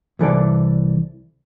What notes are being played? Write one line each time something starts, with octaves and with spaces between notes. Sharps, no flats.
C2 E3 A4 D5